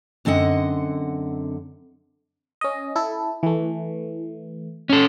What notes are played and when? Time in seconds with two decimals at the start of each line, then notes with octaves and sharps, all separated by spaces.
0.25 F#2 D3 C4 D#5 F#5
2.61 C#4 D#5
2.96 E4 A4
3.43 E3 A3
4.89 C#4 A4